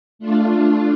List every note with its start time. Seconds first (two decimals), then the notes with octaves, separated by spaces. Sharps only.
0.19 A3 D4 F4